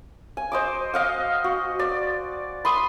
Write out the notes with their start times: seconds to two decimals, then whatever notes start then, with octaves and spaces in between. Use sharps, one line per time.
0.37 G#5
0.52 C5 D#5 D6
0.94 D#5 F5 F#5
1.44 F#4
1.79 D5
2.65 B5 C6 D#6